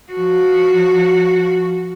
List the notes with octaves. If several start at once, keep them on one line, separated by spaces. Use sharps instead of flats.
F3 F#4